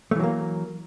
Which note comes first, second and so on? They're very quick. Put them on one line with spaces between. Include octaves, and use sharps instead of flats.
A3 E3 F#3 A#3